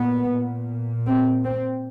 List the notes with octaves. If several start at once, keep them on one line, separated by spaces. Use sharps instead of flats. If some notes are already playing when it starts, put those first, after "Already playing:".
Already playing: A#2 B3
A#2
C4
C4